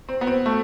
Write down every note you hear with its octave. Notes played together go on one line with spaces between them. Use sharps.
C4
B3
C4
A3